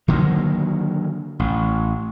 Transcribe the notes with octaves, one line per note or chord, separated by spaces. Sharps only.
D3 D#3 F#3 A#3
A1